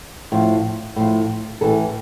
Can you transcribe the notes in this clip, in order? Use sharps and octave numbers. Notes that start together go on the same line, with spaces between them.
A2 F3
A2 F3
A2 E3 A4